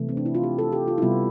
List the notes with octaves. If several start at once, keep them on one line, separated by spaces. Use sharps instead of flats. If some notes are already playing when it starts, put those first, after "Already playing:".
Already playing: C3 E3 A3
C4
D4
E4
F4
G4
A4
G4
F4
E4
C3 G3 B3 F4